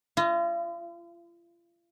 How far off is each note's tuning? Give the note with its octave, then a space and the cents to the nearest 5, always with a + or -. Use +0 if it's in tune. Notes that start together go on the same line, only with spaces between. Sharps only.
F4 -40 D#5 +0